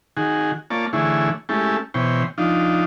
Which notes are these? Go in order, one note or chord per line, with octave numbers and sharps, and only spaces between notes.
D#3 F#4 G#4
A#3 F4 C#5 D5 A5
D3 E3 A3 E4 G#4 C#5
G#3 A3 C#4 E4 G4 A4
B2 E3 C5 C#5 G5
F3 D4 D#4 F4